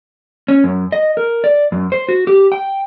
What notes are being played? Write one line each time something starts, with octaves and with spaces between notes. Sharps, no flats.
C#4
F#2
D#5
A#4
D5
F#2
C5
F#4
G4
G5